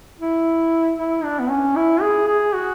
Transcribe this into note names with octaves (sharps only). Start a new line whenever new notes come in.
E4
E4
D4
B3
C#4
E4
G#4
G#4
F#4